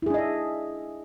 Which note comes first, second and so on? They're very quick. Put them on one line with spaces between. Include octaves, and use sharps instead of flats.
E4 G#4 D4 D#5 E5